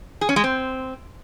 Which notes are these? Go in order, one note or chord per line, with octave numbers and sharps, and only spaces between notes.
G#4
C#4
G#3
C4